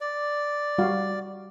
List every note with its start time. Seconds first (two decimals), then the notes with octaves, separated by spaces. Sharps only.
0.01 D5
0.78 G3 F#4 F5